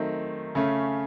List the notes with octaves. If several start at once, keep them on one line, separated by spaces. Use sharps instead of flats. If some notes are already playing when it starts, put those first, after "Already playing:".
Already playing: D#3 F#3 A3 C4 D#4
C#3 A3 C#4